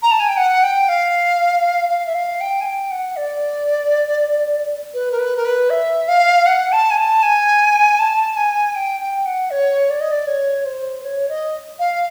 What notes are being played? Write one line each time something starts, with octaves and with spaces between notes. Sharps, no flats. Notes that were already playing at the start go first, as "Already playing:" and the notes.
A#5
A5
G#5
G5
F#5
G5
F5
F5
E5
F5
G5
G#5
G5
F#5
D5
B4
A#4
B4
A#4
B4
E5
F5
F#5
A5
G#5
A5
G#5
A5
G#5
G5
G5
F#5
C#5
D5
D#5
D5
C#5
C5
C#5
D#5
F5